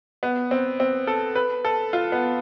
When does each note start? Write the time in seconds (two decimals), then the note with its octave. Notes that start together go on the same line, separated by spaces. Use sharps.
0.23 B3
0.51 C4
0.80 C4
1.07 A4
1.35 B4
1.65 A4
1.93 F4
2.12 B3